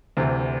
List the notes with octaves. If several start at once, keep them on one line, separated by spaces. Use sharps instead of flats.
D2 C3 E3